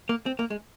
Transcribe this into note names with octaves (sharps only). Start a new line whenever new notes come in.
A#3
C4
A#3
G#3